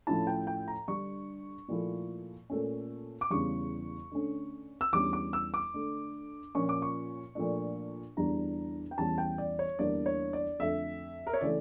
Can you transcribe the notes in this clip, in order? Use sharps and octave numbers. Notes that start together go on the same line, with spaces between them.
A2 F3 C#4 E4 A5
G5
G5
A#5
D3 G3 D4 C#6
A#2 F3 A3 E4
A#2 A3 C#4
D6
E2 C#3 G3 C#6
D3 A3 C#4
E6
E2 D3 G3 C#4 D6
D6
E6
D6
D3 A3 D4
A#2 F3 C#4 C#6
D6
C#6
A#2 F3 A3 D4
E2 D3 G3 D4 A#5
G5
E2 E3 G3 C#4 A5
G5
D5
C#5
E2 D3 G3 A#3 D4 D5
C#5
D5
F2 D3 A3 E5
A#4
C#5
C#3 E3 A3 D5